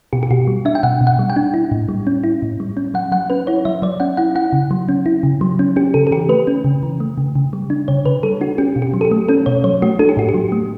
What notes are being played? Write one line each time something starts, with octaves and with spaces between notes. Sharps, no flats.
B2 G4
G4
B2 F#4
G3
D4 E5
G5
B2 F#5
B2
F#5
G3
G5
D4
E4
A2
G3
C#4
E4
A2
G3
C#4
F#3 F#5
F#3 F#5
C#4 B4
E4 C#5
F#3 E5
F#3 D5
C#4 F#5
E4 F#5
E4 F#5
C#3
F#3
C#4
E4
C#3
F#3
C#4
C#4 G4
C#3 A4
A4
E3 G4
A3 B4
C#4
C#3
E3
A3
C#3
C#3
G3
D4
C#3 C#5
C#3 B4
G3 A4
D4 F#4
C#4 G4
B2
G4
F#3
A4
G4
A3
C#4 A4
B2 C#5
F#3 C#5
A3 F#4
D4 A4
G4
A2 F#4
G4
F#3
A3